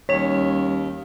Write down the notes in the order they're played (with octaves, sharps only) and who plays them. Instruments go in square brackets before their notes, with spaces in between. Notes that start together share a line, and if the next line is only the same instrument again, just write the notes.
[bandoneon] D#2 [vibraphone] G3 C#4 [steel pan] C#5